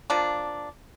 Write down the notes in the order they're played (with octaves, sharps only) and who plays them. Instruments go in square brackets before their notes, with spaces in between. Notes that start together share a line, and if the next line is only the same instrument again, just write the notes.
[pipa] F3 A#3 D4